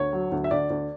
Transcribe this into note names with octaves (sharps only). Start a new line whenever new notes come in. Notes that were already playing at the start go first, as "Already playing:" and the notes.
Already playing: D2 C#5
F#3
D2
E5
D2 D5
D2